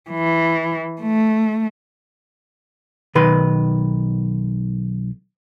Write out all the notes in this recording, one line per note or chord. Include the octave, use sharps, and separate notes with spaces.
E3
A3
B1 D#3 B4 C6